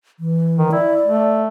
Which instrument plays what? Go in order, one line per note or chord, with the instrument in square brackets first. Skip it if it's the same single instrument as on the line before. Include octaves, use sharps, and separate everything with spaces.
[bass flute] E3
[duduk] D#3
[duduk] E4 [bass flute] D5
[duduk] A3